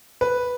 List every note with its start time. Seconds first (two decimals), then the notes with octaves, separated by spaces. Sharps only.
0.21 B4